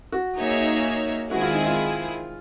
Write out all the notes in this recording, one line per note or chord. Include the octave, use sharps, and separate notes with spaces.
F#4
A#3 D#4 G#4 C#5 E5
D#3 G#3 C4 E4 F#4 G#4
F4
D#4
F4